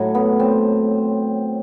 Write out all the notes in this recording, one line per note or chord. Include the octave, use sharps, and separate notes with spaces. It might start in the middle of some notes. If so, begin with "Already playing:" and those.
Already playing: A2 F#3
B3
C4